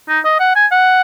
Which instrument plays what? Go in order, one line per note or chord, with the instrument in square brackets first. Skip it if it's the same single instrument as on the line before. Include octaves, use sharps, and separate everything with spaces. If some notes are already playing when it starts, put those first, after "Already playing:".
[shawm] D#4
D#5
F#5
G#5
F#5